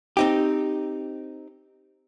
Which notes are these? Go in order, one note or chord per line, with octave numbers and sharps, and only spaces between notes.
C4 D#4 G4